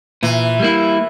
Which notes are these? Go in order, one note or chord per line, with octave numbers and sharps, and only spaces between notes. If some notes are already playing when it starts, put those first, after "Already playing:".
A#2 E3
G3 A#3 E4